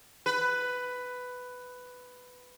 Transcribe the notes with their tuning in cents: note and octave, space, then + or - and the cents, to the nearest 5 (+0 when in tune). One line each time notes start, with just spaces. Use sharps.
B4 +10